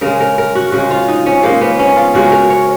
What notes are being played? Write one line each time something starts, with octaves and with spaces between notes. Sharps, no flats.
C#3 G#3 A#4
A#4
A#4
F#4
C#3 G#3 F#4
F4
D#4
C#4
C#3 G#3 A#3
B3
C#4
F4
C#3 G#3 F#4
A#4
C#5